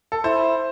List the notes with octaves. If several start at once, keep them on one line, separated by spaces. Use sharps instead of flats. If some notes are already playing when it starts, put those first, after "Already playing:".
A4
E4 C5